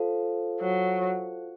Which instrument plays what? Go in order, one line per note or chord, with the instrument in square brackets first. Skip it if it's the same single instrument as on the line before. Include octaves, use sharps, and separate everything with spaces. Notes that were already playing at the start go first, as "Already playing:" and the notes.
Already playing: [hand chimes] F4 A4 C5 F5
[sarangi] F#3